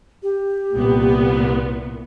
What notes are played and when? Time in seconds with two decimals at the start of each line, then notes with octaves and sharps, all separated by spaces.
0.23 G4
0.73 C2 A#2 B3